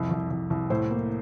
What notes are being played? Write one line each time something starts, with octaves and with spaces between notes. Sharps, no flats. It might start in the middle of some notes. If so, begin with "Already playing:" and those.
Already playing: C2 F2
C2
C2
C2
A2 C5
A#3